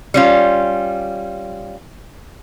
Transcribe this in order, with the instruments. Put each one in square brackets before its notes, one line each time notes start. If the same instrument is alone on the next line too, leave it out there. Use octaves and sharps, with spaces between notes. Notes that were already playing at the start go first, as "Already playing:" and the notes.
[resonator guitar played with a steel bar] G3 C#4 F4